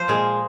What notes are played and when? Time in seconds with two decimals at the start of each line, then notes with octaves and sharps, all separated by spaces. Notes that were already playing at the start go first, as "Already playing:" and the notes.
Already playing: F3 C5
0.08 A#2 G#3